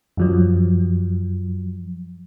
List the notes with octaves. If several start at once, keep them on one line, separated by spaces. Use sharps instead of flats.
F#2 F3 F#3